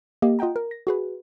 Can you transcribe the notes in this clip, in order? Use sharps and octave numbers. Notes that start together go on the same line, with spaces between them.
A#3 G4 D#5
F4 D#5 F#5 G5 A#5
A#4
A#6
F#4 G#4 B4